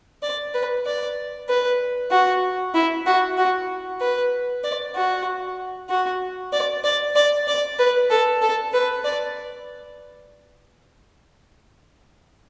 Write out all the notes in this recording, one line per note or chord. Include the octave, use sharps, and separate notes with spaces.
D5
B4
D5
B4
F#4
E4
F#4
F#4
B4
D5
F#4
F#4
D5
D5
D5
D5
B4
A4
A4
B4
D5